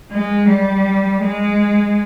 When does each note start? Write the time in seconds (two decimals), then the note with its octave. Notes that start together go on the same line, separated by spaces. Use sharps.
0.11 G#3
0.48 G3
1.21 G#3